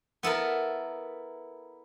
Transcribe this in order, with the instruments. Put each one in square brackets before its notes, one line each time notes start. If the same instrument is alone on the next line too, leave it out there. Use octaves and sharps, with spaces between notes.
[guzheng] B3 E4 A4 A#4